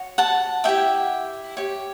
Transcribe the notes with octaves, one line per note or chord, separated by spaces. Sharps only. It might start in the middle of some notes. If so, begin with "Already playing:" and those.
Already playing: F#4 C#5
F#5 A5
E4 G4 D5 E5 G5
G4 C#5